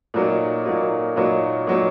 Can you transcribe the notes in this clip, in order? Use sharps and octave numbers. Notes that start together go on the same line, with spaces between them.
A#2 F#3 A#3 D#4
A#2 F#3 A#3 D#4
A#2 F#3 A#3 D#4
A#2 F#3 A#3 D#4